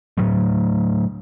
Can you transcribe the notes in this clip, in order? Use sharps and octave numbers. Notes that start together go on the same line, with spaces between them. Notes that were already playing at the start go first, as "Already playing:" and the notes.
A2 F#3 A3